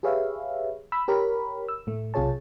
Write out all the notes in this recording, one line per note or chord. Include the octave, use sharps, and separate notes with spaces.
G4 G#4 B4 C#5 E5 F5
B5 E6
G4 A#4 C#5 B5
E6
A2 A3
B1 C3 F4 G#4 C#5 A5